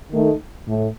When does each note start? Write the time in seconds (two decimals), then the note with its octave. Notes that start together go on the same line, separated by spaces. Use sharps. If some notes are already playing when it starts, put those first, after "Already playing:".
0.11 D#3 A3 D#4
0.68 A2